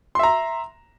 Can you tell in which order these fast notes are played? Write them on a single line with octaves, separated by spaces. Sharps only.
C6 E5 A#5